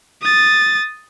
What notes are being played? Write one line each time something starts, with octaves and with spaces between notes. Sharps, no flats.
D#6 A6